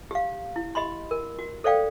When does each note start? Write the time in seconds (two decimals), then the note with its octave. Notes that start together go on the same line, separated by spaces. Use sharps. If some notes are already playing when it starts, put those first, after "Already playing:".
0.11 G4 F5
0.56 E4
0.75 G4 D#5 B5 C6
1.11 A#4
1.39 F#4
1.64 A4 C5 D5 F5 G5